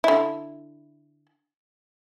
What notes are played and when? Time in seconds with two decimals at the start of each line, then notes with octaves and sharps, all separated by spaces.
0.04 D3 E4